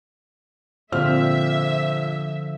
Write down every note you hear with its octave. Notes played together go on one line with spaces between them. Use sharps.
A#2 D3 F3 C4 E5 F6